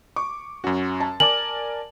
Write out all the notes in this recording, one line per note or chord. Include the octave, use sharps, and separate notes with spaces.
C#6 D6
F#2 C#4 F#4
A5
A#4 D5 G#5 A5 D6 F#7